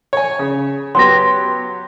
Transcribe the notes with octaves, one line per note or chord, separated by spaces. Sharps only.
C#5 G#5
C#3
F#3 B3 G4 C6 A#6